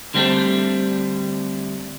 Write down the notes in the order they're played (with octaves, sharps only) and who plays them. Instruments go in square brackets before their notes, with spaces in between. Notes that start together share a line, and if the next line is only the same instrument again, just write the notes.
[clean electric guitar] D3 G3 A3 C4 D4